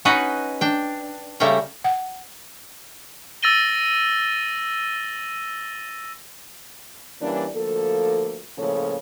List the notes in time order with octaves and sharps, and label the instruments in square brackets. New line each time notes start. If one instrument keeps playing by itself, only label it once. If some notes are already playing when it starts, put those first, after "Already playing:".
[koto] C#4 D#4 F#4 B4 D#5
D4 G5
C#3 G3 A3 A#3 A#4 G5
[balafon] F#5
[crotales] E6 A6 A#6 D#7 G7
[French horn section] E3 G3 A#3 C#4 D4
D2 F3 A#3 A4
A2 C#3 F3 A#3 A4 C#5